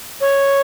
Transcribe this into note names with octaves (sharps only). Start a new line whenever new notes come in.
C#5